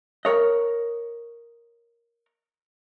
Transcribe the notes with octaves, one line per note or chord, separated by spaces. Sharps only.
A#4 C#5 D#5